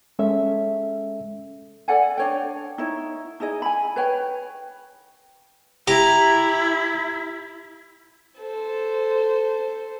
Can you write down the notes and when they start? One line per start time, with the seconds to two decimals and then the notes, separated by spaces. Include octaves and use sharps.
0.19 G#3 C#4 A4 E5
1.88 A4 D5 F#5 G#5
2.18 D4 C#5 G5
2.78 D#4 E4 C#5
3.40 D#4 E4 G#4 D#5
3.62 G#5 B5
3.96 B4 C#5 G5
5.87 E4 G4 A#5
8.40 A4 C5